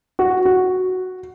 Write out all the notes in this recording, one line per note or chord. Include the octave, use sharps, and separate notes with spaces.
F#4
F#4